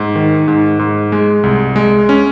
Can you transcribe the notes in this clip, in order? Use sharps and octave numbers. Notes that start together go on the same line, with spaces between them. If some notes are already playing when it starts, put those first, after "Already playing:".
Already playing: G#2
D#3
G#2
G#2
G#3
C2
G#3
C#4